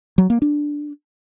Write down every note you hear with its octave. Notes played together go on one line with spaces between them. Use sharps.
F#3
A#3
D4